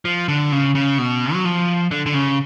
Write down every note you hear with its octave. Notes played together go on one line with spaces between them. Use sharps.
F3
D3
C#3
C#3
B2
F#3
F3
D3
D3
C#3